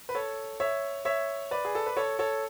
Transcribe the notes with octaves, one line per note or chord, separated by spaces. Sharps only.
B4
A4 C#5
C#5 E5
C#5 E5
B4 D5
G#4
A4
B4
A4 C#5
A4 C#5